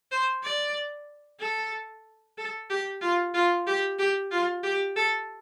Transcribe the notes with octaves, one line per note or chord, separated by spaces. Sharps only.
C5
D5
A4
A4
G4
F4
F4
G4
G4
F4
G4
A4